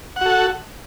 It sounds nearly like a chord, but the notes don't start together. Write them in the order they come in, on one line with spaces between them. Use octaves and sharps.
F#5 F#4 A4